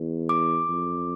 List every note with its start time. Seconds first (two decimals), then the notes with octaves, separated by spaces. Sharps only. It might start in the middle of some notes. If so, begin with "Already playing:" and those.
Already playing: E2
0.29 D6
0.69 F2